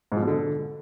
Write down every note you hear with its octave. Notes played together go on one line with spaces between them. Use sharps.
G#2
F3
B2
D3